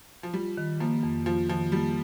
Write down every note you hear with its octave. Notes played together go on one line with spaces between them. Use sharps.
F3
G3 F4
D#3
F3 A#3
F2
F3 F4
D#3 F3
G3 A#3